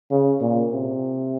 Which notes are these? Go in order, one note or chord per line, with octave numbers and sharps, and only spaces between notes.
C#3
A#2
C3